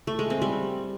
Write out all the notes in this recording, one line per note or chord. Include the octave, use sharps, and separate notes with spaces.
A3
G#3
C4
G3